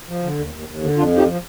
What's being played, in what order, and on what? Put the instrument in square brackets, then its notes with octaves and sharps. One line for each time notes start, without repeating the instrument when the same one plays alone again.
[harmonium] F3
D3
D#2
D#2
D#2
D3
F2 D4 F4
F3
D#4 G4
F3